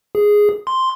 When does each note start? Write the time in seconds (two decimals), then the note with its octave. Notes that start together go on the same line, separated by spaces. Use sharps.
0.15 G#4
0.67 C6